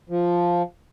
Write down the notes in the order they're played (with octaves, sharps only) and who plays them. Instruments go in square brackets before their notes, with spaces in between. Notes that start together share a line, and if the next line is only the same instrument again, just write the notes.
[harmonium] F3